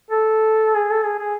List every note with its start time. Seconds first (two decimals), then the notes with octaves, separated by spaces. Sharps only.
0.10 A4
0.75 G#4
0.91 A4
1.04 G#4
1.19 G#4